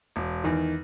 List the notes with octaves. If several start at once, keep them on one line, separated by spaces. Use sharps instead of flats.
E1
E2 D#3